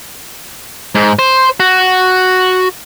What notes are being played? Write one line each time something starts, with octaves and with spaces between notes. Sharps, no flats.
G#2
C5
F#4